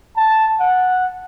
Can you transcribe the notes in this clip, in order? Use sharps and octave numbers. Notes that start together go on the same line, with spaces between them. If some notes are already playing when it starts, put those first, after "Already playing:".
A5
F#5